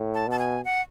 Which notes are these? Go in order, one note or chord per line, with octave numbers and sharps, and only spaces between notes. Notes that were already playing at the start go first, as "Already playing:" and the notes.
Already playing: A2
A5
B2 A5
G#5
F#5